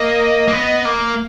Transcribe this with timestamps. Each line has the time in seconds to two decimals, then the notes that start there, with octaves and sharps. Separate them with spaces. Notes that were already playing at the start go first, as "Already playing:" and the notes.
Already playing: A#3 D#5
0.48 A#3
0.52 B3
0.85 A#3